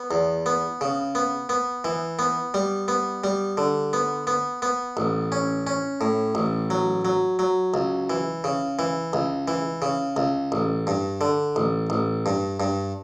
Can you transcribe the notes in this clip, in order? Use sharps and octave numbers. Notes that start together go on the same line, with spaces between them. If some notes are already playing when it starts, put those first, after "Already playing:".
Already playing: B3
E2
B3
C#3
B3
B3
E3
B3
G3
B3
G3
D3
B3
B3
B3
A1
C#4
C#4
A2
A1
F#3
F#3
F#3
C#2
E3
C#3
E3
C#2
E3
C#3
C#2
A1
G2
D3
A1
A1
G2
G2